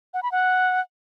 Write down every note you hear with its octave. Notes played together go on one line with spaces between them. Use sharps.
F#5
B5
F#5